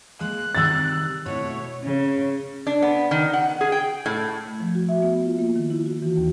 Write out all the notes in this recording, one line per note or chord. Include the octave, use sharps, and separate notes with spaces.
G#3 A#3 F#6
C3 D#3 G3 E6 A6
B2 A3 E4 C#5
C#3
D4
B3
D#3
F#5
G#4
G5
A2
A3
F3
F#4
E5
B3
F4
A#3
D#3
E4
F#4
E3
D#2